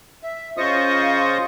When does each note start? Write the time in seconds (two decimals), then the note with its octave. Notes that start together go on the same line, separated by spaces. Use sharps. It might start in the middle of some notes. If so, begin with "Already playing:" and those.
0.23 E5
0.58 C#3 F4 C5 D#5 C#6 D#6